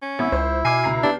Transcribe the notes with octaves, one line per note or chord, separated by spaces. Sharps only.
C#4
G#1 B3 E4
C#2 C5
B2 G#5 D6 F6 C7
C#2 A#5 C7
B3 D4 G4